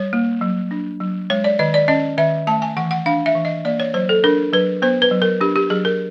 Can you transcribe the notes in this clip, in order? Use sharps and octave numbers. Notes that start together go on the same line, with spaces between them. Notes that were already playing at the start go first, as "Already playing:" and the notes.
Already playing: G3 C#5
A#3
F#3
D4
F#3
G#3 C#5
D5
D#3 D#5
D5
C#4 D#5
D#3 E5
A3 A5
G#5
E3 F#5
F#5
D4 F5
E5
E3
D#5
A#3 D5
C#5
F#3 C5
A4
D4 A#4
F#3 B4
B3 C5
B4
F#3
A#4
D4 G4
G4
F#3 G#4
A#4